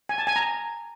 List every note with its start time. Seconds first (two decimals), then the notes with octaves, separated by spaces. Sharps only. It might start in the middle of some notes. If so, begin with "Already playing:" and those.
0.09 G#5
0.18 A5
0.27 G#5
0.36 A#5